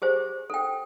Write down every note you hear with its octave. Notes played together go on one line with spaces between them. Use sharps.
G4 G#4 C5
A4 G5